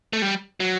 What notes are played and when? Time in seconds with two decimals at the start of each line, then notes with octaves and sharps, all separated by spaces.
0.13 A3
0.22 G3
0.60 F#3